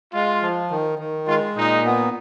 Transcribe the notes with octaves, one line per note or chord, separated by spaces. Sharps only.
G#3 F4
F3
D#3
D#3
G#3 F4
A#2 D#4
B3